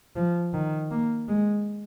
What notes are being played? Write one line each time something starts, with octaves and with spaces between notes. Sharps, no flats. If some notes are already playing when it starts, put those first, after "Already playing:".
F3
D#3
A#3
G#3